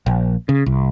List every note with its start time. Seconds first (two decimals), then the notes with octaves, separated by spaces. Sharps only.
0.06 A#1
0.49 C#3
0.66 C2